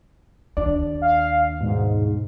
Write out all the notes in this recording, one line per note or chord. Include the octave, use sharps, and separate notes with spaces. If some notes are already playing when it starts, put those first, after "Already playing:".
D#2 D4 D5
F5
G#2 B2